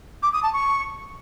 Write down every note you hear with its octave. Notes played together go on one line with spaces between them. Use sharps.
D6
D#6
A5
C#6